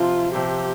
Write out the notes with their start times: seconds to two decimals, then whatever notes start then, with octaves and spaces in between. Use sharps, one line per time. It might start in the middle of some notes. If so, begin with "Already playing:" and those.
Already playing: C3 F3 C4 F4
0.33 C3 F3 C4 G4